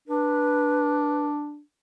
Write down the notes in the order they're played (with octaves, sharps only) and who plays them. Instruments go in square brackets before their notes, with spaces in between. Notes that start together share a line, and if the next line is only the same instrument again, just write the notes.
[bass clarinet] D4 [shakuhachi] B4